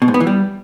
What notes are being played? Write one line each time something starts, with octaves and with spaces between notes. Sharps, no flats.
B2
G#2
B3
E3
G3